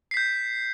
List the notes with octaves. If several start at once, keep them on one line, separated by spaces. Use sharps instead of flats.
G6 B6 C7